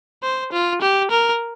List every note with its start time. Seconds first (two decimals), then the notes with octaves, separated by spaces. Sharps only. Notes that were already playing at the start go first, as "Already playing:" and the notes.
0.23 C5
0.52 F4
0.81 G4
1.11 A#4